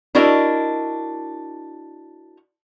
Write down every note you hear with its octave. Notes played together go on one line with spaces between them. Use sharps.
D4 E4 F#4 A#4 D#5